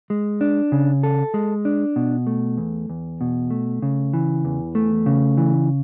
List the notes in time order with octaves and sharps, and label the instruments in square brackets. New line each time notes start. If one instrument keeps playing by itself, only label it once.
[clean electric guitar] G#3
D4
C#3
A4
G#3
D4
B2
A3
E2
E2
B2
A3
C#3
E3
E2
A3
C#3
E3